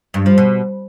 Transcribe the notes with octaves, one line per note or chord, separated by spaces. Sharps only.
G2
F3
B2